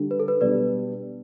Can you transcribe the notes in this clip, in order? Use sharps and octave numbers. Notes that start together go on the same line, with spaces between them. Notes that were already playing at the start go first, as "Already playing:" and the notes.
Already playing: D3 G3 D4
B4
A4
B4
B2 G3 D4 B4 D5